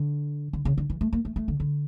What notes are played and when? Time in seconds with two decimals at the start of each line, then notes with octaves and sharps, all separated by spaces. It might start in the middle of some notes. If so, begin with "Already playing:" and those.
Already playing: D3
0.53 D3
0.65 C#3
0.78 D3
0.90 E3
1.01 A3
1.13 A#3
1.25 A3
1.36 A3
1.48 D3
1.60 D3